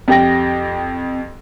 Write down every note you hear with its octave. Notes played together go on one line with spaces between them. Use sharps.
F2 G4 G5 A#6